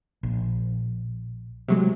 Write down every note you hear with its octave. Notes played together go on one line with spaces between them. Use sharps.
A#1
C3 F#3 G#3